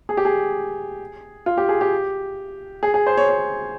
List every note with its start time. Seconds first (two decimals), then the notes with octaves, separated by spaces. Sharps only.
0.09 G#4
0.17 G4
0.25 G#4
1.46 F4
1.57 G4
1.69 G#4
1.81 G4
2.83 G#4
2.94 G#4
3.07 C5
3.17 C#5
3.29 C#5